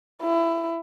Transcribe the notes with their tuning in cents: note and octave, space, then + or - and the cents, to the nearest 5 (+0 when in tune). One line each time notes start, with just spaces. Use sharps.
E4 +20